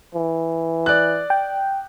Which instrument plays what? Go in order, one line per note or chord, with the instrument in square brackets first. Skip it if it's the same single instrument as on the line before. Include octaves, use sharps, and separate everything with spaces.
[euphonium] E3
[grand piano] D5 F#6
[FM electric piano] G5